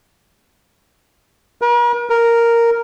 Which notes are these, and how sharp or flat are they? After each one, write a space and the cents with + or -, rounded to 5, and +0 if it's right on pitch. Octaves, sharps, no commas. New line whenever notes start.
A#4 +45
A#4 -5